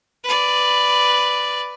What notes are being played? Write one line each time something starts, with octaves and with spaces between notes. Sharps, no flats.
B4 D5